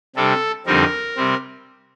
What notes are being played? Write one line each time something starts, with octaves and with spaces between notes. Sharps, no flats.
C3 G3 D4 A4
F2 D3 G3 C4 D#4 A#4
C3 G3 C4